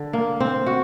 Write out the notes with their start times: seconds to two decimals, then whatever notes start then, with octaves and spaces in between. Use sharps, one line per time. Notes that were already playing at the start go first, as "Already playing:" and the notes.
Already playing: D3
0.13 A#3
0.40 C4
0.66 F#4